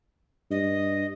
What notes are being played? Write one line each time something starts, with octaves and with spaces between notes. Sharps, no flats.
G2 D#5